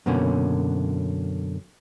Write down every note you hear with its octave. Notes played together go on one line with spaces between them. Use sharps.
F#2 B2 D3 A#3 B3 C#4